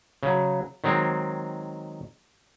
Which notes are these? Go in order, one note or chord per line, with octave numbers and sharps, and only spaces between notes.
C#3 F#3
D#3 F#3 G#3 C4